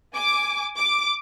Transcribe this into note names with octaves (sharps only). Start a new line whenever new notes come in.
G#5 D6
D6